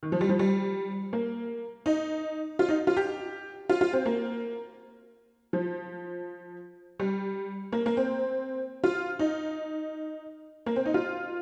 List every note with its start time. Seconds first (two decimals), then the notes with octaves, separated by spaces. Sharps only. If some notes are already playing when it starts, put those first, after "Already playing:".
0.03 D#3
0.12 F3
0.21 G3
0.29 F3
0.39 G3
1.13 A#3
1.86 D#4
2.59 F4
2.69 D#4
2.87 F4
2.97 G4
3.69 F4
3.81 F4
3.93 C4
4.06 A#3
5.53 F3
7.00 G3
7.72 A#3
7.86 A#3
7.97 C4
8.84 F4
9.19 D#4
10.66 A#3
10.76 C4
10.86 D#4
10.94 F4